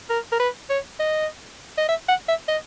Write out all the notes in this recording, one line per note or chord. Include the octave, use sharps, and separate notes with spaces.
A#4
A#4
B4
C#5
D#5
D#5
E5
F#5
E5
D#5